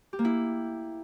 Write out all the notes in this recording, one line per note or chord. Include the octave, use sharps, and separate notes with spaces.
G4
A#3
E4